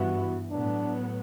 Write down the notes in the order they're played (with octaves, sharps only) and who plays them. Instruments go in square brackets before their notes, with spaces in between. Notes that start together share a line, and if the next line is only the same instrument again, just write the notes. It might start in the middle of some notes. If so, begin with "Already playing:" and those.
Already playing: [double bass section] G2 E3 B3 [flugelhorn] F#4
[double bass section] A2 F#3 B3 [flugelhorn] D4